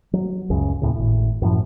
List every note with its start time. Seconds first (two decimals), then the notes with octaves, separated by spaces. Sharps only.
0.13 F#3
0.50 C#2 F#2 C#3
0.82 D#2 A2 C#3
0.95 G#1 A2
1.42 F#2 A2 F3